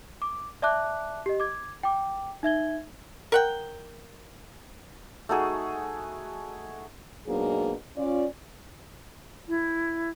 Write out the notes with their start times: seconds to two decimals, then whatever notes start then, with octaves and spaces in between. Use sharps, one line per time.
0.22 D6
0.62 D5 E5 A5 D6 F#6
1.26 G4 D#5
1.40 D6 G#6
1.83 G5 D6
2.43 D#4 E5 G#6 G7
3.32 A#4 F#5 G5
5.29 A3 D#4 F#4 G#4
7.27 G#2 B2 F#3 A#3 D4 G#4
7.97 C#4 F4 D5
9.48 E4